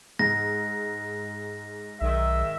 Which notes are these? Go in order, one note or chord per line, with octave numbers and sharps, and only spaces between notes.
G#2 A#6
B1 D#3 E5